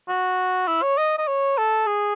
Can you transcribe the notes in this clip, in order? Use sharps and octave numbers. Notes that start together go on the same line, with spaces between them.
F#4
E4
C#5
D#5
D#5
C#5
A4
G#4